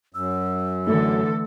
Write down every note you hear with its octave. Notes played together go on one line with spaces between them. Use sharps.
F#2 E6
D3 E3 A3 A4